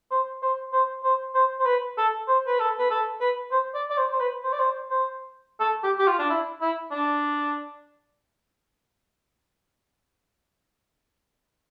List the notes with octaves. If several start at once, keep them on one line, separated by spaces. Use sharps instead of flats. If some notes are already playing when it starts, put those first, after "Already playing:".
C5
C5
C5
C5
C5
C5
B4
A4
C5
B4
A4
B4
A4
B4
C5
D5
D5
C5
C5
B4
C5
D5
C5
C5
A4
G4
G4
F4
D4
E4
E4
D4